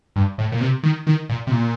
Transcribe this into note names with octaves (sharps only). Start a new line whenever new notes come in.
G2
A2
A#2
C3
D#3
D#3
A#2
C3
A#2